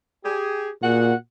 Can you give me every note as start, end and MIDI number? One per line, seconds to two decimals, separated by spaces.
0.25 0.70 67
0.25 0.70 68
0.83 1.13 46
0.83 1.14 66
0.83 1.14 68
0.83 1.14 78